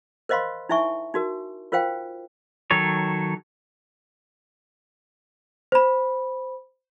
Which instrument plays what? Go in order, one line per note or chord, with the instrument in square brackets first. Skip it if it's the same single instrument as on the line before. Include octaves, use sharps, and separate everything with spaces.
[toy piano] A#4 C5 D#5 F5 B5 C6
D#4 E4 E5 G#5 C#6
D#4 F#4 A#4
F4 A#4 C5 F5 G5
[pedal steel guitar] D#3 F#3 A4 C#5
[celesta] C5 B5